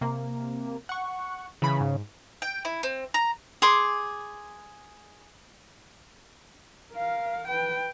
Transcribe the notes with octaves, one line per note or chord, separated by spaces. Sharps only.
C3 A#3
F#5 C#6
C#3 E3 B5
G#2
G5
E4
C4
A#5
G#4 C6 D6
A#4 F5
B4 G5